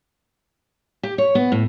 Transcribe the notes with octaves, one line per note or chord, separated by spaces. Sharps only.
G4
C#5
B3
A2